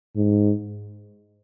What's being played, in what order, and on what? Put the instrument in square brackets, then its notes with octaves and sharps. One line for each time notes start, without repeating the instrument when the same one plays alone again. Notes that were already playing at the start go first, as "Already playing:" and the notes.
[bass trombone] G#2